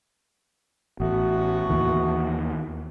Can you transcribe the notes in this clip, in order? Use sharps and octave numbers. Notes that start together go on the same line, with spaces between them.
A1 A3 B3 F#4
D#2 E3